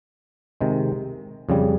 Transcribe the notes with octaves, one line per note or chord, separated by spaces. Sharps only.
C3 D#3 G#3
F2 C#3 G3